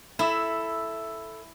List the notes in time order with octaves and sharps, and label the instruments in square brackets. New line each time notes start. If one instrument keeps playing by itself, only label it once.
[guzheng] E4 [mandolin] A4 E5 E6